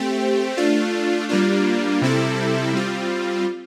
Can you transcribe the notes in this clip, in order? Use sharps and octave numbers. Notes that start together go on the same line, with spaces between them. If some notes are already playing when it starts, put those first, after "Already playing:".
Already playing: A3 C4 G4
A3 D4 F4
G3 A#3 D4 F4
C3 G3 C4 E4 A4
G3 C4 F4